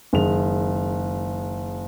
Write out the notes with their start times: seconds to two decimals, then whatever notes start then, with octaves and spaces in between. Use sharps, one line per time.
0.13 F#1 D#3 G#3 F7